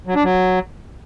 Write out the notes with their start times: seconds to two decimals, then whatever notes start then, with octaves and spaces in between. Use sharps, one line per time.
0.07 F#3
0.15 D4
0.23 F#3